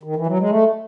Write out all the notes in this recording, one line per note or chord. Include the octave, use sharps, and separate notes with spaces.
D#3
E3
F#3
G#3
A3